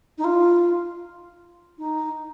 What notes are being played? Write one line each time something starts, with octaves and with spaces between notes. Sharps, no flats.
D#4
F4
D#4